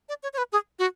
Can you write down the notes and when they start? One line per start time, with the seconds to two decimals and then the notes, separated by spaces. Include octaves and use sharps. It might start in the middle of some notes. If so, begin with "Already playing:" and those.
0.09 D5
0.23 C#5
0.33 C#5
0.38 B4
0.52 G#4
0.79 F#4